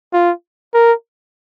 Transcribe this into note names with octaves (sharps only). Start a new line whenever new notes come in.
F4
A#4